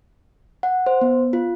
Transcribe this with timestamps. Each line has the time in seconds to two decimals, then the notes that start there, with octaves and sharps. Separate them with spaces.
0.63 F#5
0.86 C5
1.01 B3
1.33 F4